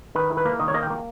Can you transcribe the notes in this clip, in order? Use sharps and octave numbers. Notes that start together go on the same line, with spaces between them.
D#3 B4
E4
B4
A#3
D#3 D#5
C#5
A#3 D#5
G5
A#3